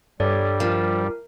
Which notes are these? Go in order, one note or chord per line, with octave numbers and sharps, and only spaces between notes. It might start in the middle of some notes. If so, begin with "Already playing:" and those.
G2 G3 A4 C#5 D5
F3 A#4